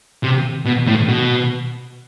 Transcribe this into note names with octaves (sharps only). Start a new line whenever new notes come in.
C3
B2
A2
B2